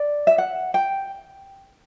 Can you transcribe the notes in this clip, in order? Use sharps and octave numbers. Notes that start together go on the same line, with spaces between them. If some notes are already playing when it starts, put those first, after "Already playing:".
Already playing: D5
E5
F#5
G5